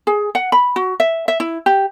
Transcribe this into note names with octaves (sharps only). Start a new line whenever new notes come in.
G#4
F#5
B5
F#4
E5
E5
E4
G4